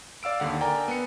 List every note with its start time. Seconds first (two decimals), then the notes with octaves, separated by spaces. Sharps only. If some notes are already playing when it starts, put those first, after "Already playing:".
0.23 D5 F5 E6 D7
0.40 D#2 D3 F#5
0.61 A#4 D5 G5 G#5 A#5
0.88 B3 C#7